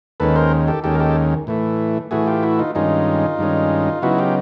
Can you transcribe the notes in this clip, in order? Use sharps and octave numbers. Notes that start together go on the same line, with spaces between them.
D#2 D#3 G#3 C#4 A4 B4
A#4 C5
G4 A4
D#2 D#3 G#3 C#4 G4 A4
A#4
G4 A4
A2 E3 A3
A2 E3 A3 F#4 G#4
F4 G4
E4 F#4
D#4 F4
G2 D#3 G#3 C#4 D#4 F4
G2 D#3 G#3 C#4
C#3 F#3 B3 D#4 E4 F#4
F4 G4